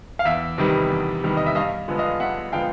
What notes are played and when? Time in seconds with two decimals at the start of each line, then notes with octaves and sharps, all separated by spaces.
0.19 F5
0.25 E2 E5
0.58 C3 D#3 G3 B3
0.90 E2
1.23 C3 D#3 G3 B3
1.37 D#5
1.46 E5
1.55 G2 D#5 F5
1.88 D3 F3 G#3 B3
1.98 D#5 F5
2.20 G2 E5 F#5
2.52 D3 F3 G#3 B3 F5 G5